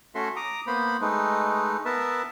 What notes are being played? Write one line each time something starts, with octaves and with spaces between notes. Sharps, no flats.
A3 C#4 F#4 A4 E5 C6
A#5 D6 D#6
A#3 B3 C5 B5
G#3 A3 D#4 B4
B3 A#4 B4 E5 A5